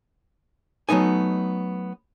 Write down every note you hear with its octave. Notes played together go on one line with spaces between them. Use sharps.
F#3 A3 B3 D#4 G#5